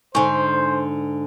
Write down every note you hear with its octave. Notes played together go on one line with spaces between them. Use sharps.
G#2 D3 C5 G#5 C#6